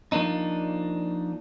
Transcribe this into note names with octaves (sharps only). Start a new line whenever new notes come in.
F3 A#3 D4 D#4